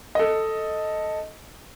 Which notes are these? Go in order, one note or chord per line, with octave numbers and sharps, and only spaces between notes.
A4 D#5